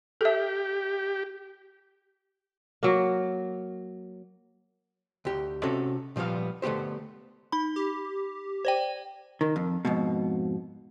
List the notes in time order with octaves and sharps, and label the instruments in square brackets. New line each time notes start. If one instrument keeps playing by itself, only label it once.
[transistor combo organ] G4 [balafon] A4 E5
[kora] F#3 A#3
[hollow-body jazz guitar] D2 G4
C3 C#4 F#4 A4
A#2 F3 G3 B3 F5
D3 A3 B3 G4 C5
[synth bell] D#4 B5
[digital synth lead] G4
[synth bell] C5 D5 G5
[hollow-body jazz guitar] D#3
F2
F2 G#2 B2